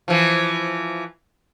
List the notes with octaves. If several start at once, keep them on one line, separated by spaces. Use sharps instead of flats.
E3 F3